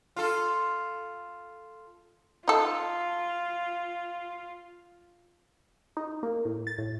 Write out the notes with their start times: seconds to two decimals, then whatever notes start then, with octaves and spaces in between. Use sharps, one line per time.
0.16 F4 A4
2.48 D#4 F4 A4
5.97 D#4
6.23 A#3
6.45 A2
6.67 A6
6.78 A2